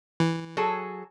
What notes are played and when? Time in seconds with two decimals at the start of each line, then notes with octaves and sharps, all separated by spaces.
0.20 E3
0.57 F#3 G#4 A4